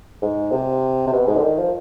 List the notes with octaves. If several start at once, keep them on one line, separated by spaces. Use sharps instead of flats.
G#2
C3
C3
B2
G#2
D3
D#3
F3